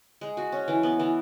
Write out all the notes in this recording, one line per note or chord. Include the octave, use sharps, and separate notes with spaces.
G#3
F#4
C#4
E3
B3
E3